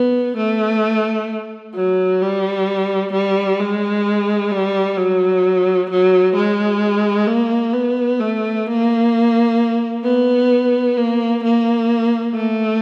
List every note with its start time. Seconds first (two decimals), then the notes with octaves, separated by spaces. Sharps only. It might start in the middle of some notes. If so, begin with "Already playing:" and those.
Already playing: B3
0.37 A3
1.75 F#3
2.21 G3
3.12 G3
3.59 G#3
4.52 G3
4.97 F#3
5.90 F#3
6.35 G#3
7.27 A#3
7.73 B3
8.20 A3
8.67 A#3
10.04 B3
10.97 A#3
11.43 A#3
12.34 A3